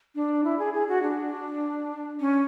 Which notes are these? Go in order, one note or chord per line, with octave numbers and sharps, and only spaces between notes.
D4
E4
G#4
G#4
F#4
D4
C#4